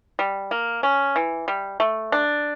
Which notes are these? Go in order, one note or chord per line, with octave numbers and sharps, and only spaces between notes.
G3
A#3
C#4
E3
G3
A3
D4